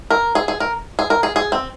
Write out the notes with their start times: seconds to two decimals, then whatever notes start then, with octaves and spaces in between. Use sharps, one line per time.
0.10 A#4
0.35 G#4
0.48 G#4
0.60 A#4
0.99 G#4
1.10 A#4
1.23 G#4
1.36 G#4
1.52 C4